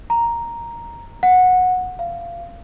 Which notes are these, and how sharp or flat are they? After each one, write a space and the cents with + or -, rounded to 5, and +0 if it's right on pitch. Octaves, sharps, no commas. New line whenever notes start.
A#5 +0
F#5 -15
F5 -25